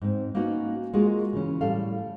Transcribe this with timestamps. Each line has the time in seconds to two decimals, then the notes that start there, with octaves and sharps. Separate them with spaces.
0.02 G#2 C4
0.35 A#3 B3 C#4 D#4 F#4 B4
0.94 G#3 A#3 F4 F#4 G#4 A#4
1.33 C#3 E3 C#4
1.61 A2 G3 A4 F5